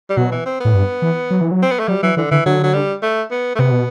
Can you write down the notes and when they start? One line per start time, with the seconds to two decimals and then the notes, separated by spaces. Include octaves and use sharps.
0.10 G3
0.17 B2 F#3
0.31 E3
0.46 C4
0.60 A2 B3
0.74 G2
1.02 E3
1.31 F#3
1.41 E3
1.51 F#3
1.62 C4
1.71 B3
1.80 A3
1.88 F#3 G3
2.03 E3 F#3
2.17 D3 E3
2.31 D3 E3
2.46 D3 F#3
2.63 F#3
2.74 G3
3.02 A3
3.31 B3
3.55 A3
3.59 C3 B3
3.71 B2